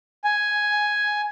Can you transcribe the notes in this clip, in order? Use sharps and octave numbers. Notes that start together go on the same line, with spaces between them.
G#5